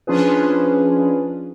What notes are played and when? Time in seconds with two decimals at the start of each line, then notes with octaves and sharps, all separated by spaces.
0.07 F3 C#4 D4 F4 G#4 B4